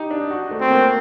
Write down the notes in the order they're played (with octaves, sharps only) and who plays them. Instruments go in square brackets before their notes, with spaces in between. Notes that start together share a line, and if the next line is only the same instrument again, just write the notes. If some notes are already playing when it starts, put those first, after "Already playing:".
Already playing: [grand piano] D#4 G4
D4
F#4
A3
[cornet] C4
[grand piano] A#3